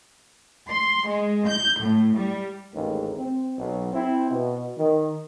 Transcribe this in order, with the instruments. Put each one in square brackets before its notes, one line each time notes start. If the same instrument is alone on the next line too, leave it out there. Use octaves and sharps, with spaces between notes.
[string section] C6
G#3
G6
A2
G3
[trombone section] A1 D#2 G#2
C4
B1
C4 E4
B2
D#3